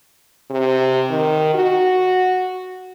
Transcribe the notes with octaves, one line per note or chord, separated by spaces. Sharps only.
C3
D#3
F#4